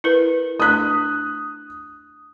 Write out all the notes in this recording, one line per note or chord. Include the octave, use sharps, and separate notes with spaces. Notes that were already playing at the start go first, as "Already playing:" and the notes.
E4 A#4 B4
A3 D4 D#6 F#6